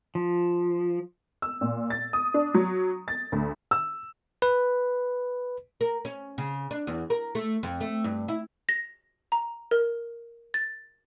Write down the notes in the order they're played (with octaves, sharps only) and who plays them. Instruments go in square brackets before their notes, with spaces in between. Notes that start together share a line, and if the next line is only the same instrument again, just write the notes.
[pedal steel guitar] F3
[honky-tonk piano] E6
A#2
A6
D#6
D4
F#3
A6
D2
[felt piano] E6
[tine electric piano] B4
[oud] A#4
C#4
C#3
D4
E2
A#4
A3
F2
A3
G2
E4
[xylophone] A#6
A#5
A#4
A6